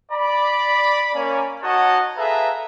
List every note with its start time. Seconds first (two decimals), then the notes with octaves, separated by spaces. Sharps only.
0.12 D5 B5
1.15 A#3 C#4
1.63 D#4 F#4 C#5 D#5 F#5 A5
2.18 G#4 A4 B4 E5 F5 A#5